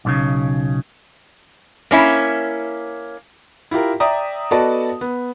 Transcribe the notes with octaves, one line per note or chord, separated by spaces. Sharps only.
B1 A#2 C#3
A#3 C#4 E4
E4 F4 G4 A#4
D5 E5 G5 A#5 D#6
B3 F#4 A4 D5 D#5 A5
B3